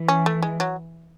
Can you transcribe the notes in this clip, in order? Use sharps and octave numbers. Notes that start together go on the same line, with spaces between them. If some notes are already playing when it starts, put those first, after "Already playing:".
Already playing: E3
C#4
A3
G#3
F#3